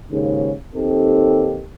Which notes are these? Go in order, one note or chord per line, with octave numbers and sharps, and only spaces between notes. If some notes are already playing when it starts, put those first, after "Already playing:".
D#2 G#2 C#3
D#2 C4 D#4 G4 A4